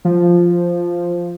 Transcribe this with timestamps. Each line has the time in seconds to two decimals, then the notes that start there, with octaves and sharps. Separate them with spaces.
0.05 F3